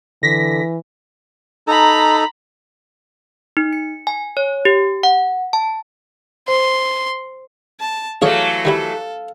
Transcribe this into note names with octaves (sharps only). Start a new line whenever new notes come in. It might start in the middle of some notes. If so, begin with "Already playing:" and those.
D3 E3 A#6 B6
D#4 A4 A#5 B5
D#4
C#7
G#5
C#5
G4
F#5
A5
C5 C6
A5
E3 F#3 A3 G#4 A4 C#5 D5 F5
D#3 G3 E4